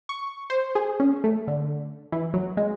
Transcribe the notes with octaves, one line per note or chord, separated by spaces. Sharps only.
C#6
C5
G#4
C#4
A3
D3
E3
F#3
G#3